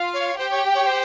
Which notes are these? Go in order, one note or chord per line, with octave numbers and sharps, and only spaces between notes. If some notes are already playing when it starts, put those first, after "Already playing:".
Already playing: F4 F5
C#5
G4 C5 G5
C#5
C#5
C5